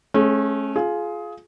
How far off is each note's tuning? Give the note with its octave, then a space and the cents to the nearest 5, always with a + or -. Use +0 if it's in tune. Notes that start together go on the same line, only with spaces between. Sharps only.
A3 -40 C#4 -25 G#4 +0
F4 +0 G#4 +20